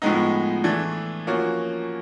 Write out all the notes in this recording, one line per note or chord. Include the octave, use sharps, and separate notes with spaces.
A2 F3 G#3 B3 D#4
E3 A3 D4
F3 A#3 C#4 F#4